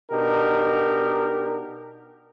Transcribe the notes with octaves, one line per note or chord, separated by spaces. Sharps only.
B2 D4 D#4 F#4 G4 A#4